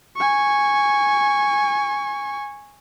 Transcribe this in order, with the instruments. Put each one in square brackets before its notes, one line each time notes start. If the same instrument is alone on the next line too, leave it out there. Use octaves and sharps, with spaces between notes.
[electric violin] G#5 C#6